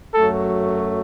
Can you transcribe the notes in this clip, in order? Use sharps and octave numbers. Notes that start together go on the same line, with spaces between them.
F#2 F#3 A3 A4